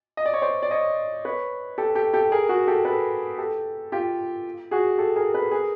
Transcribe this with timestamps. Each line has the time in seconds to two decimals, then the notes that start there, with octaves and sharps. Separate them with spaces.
0.17 D#5
0.25 D5
0.34 C#5
0.42 C5 D5
0.62 D5
0.71 C#5 D#5
1.25 B4 C#5
1.78 G4 A4
1.95 G4 A4
2.14 G4 A4
2.32 G#4 A#4
2.49 F#4 G#4
2.67 G4 A4
2.85 A4 B4
3.38 G4 A4
3.92 F4 G4
4.71 F#4 G#4
4.98 G4 A4
5.16 G#4 A#4
5.34 A4 B4
5.51 G#4 A#4